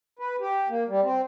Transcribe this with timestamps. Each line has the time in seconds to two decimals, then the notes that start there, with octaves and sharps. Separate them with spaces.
0.19 B4
0.40 G4
0.69 A#3
0.89 G3
1.03 C4